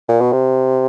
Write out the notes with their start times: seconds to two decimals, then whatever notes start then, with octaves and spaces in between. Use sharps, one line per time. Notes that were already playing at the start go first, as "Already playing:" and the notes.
0.09 A#2
0.21 B2
0.33 C3